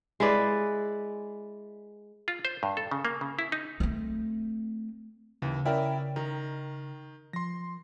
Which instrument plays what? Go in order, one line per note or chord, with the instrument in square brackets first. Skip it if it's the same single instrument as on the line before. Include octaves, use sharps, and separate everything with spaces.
[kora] G#3 E4 B4 D5
[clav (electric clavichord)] F4
C5
G2
A4
C#3
A#3
C#3
E4
D#4
[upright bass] A3 C4
[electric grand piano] D#2 E3 [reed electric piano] C#3
[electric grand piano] C#4 D5 E5 [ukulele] E4 A#4 G5
[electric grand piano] D#3 [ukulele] A#4
[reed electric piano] F3 [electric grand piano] C6 A#6